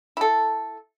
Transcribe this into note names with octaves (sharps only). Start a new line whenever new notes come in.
E4 A4